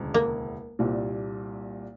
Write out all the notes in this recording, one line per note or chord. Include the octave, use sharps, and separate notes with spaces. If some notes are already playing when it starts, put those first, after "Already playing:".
Already playing: E1 D2 C#3
A#3
C2 A#2 G3